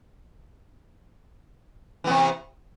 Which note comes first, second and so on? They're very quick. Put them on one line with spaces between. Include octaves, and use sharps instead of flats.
E3 B3 C3